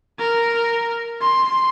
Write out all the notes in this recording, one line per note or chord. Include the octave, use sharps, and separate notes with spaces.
A#4
C6